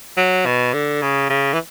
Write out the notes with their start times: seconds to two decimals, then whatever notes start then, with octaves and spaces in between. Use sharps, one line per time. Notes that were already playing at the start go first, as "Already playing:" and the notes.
0.17 F#3
0.46 B2
0.74 D3
1.02 C#3
1.30 C#3
1.53 E3